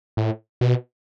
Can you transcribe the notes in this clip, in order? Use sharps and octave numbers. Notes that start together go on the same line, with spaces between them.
A2
B2